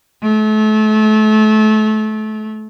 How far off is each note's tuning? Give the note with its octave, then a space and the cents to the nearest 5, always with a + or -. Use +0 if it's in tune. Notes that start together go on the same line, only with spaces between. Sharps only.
A3 -30